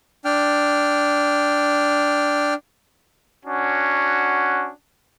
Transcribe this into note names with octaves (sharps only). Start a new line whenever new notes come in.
D4 G5 F6
C#4 D4 F#4